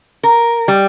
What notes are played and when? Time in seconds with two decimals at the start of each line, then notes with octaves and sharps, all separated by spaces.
0.23 A#4
0.68 G3